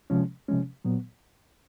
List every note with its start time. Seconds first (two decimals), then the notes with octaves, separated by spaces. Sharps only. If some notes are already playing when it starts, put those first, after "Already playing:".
0.10 C3 F3 G#3 C#4
0.48 C3 F3 G#3 C#4
0.85 A#2 F#3 B3